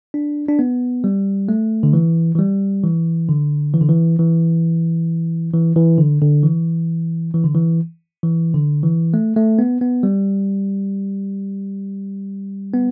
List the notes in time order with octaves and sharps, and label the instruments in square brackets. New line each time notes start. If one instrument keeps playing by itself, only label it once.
[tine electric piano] D4
D4
B3
G3
A3
D3
E3
E3
G3
E3
D3
E3
D3
E3
E3
E3
E3
D3
D3
E3
E3
D3
E3
E3
D3
E3
A3
A3
B3
B3
G3
B3